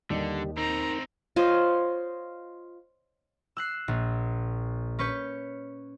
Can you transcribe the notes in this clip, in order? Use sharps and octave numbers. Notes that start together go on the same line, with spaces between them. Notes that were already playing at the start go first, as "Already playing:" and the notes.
D#2 D3 G3 D#5
D#3 C4 D#4 A#5
F4 C5 C#5 D#5
E6 F#6 C7
A#1
C#4 B4 C#6 G6